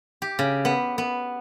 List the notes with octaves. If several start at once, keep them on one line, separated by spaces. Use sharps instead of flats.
G4
C#3
B3
B3